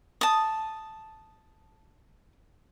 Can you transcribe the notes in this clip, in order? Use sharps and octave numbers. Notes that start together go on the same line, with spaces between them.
A5 D#6